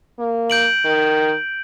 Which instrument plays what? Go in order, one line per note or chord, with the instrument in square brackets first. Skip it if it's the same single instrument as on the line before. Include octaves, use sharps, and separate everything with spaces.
[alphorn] A#3
[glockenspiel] G6 D7 F#7
[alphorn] D#3